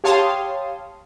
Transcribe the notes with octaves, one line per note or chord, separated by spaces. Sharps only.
G4 C#5 F5 A5 C6 D#6